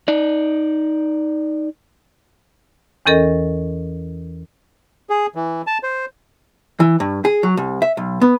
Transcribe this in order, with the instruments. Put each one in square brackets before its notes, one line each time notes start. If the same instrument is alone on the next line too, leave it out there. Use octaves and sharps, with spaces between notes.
[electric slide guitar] D#4 D5
[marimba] E2 E3 C#4 A4 A#4 D#5
[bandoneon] G#4
E3
A5
C5
[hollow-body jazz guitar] E3
G2
G#4
F#3
C2
E5
B1
B3